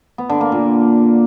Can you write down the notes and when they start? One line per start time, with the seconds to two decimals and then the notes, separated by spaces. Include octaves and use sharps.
0.18 B3
0.29 D3
0.41 A#3
0.52 A#2